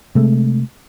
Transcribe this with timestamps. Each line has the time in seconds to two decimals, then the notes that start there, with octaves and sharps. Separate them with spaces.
0.15 C3 G#3 A3